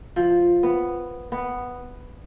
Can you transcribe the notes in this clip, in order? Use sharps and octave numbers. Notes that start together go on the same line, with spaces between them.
F3
B3
B3